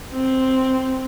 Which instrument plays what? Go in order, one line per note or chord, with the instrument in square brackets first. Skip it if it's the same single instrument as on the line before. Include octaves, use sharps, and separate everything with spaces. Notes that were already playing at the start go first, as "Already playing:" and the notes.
[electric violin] C4